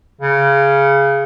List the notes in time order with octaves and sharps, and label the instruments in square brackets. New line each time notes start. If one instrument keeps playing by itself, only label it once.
[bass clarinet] C#3